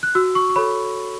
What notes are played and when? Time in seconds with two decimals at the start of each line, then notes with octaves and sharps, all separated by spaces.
0.03 F#6
0.15 F#4 E6
0.35 C#6
0.50 C#6
0.56 A4 C#5 B5